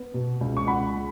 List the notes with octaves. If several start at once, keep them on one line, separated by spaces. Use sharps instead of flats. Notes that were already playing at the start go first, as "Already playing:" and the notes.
Already playing: B3
B2
C#2
C#6
C#2 F#5 B5
G#3